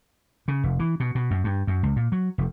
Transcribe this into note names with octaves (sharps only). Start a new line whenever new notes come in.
C#3
F1
E3
B2
B2
F#2
G2
F#2
C#2
A#2
F#3
F1